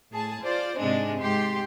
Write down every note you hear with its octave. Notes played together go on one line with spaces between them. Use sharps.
A2 G#4 A5
F4 C5 D5
G#2 C3 G#3 C4 D4
G#2 G4 C6